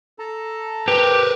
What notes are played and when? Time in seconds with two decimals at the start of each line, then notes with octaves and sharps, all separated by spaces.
0.19 A4 A5 A#5
0.88 G4 A#4 B4